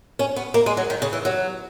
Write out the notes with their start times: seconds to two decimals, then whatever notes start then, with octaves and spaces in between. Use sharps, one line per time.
0.19 C#4
0.36 B3
0.54 A#3
0.66 G#3
0.77 F#3
0.90 D#3
1.02 C#3
1.13 E3
1.25 F#3